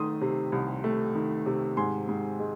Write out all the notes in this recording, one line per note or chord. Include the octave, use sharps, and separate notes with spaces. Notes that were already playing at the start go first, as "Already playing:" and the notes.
Already playing: D#3 A3 C6 D#6
C3
C2
A3
D#3
C3
G#2 G#5 C6
G#2
G#3